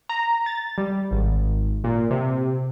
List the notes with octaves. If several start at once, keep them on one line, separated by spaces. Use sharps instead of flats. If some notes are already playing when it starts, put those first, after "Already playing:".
A#5
A6
G3
G#1
A#2
C3